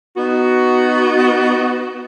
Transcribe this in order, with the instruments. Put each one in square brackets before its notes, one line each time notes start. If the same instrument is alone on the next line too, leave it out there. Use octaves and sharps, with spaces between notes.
[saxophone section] B3 D#4 F#4